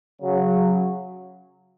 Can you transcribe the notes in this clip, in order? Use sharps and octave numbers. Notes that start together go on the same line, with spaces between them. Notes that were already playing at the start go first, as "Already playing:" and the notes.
C#3 F#3